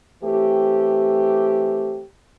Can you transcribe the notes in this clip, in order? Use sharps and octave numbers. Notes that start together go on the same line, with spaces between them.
E3 A3 C4 G4